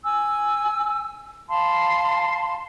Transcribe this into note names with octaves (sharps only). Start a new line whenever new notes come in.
G#5 E6
F5 A5 B5 C6